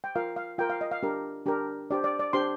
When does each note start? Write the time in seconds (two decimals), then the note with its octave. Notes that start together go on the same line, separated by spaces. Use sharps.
0.04 G5
0.15 F4 A#4 F5
0.36 F5
0.58 F4 A#4 G5
0.70 F5
0.81 D#5
0.91 F5
1.03 D4 G4 A#4
1.46 D4 G4 A#4
1.90 D4 G4 C5 D5
2.04 D5
2.19 D5
2.33 D4 G4 C5 C6